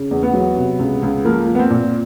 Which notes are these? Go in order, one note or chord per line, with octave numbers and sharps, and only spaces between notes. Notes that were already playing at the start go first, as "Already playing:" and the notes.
Already playing: C#3
E2
B3
F#3
C3
C#2
C#2
F3 A#3
F3
B3
C4
A#2